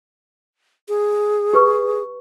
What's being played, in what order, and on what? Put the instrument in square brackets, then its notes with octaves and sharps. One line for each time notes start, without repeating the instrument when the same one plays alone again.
[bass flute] G#4
[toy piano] G4 B4 C#6